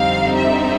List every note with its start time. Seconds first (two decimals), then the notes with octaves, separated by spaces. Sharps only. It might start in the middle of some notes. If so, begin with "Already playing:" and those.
Already playing: F2 D3 G3 C4 D#4 F5
0.36 E5